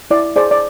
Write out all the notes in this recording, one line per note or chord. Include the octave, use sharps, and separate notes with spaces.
E4 D5
G#4 C5 D5
D5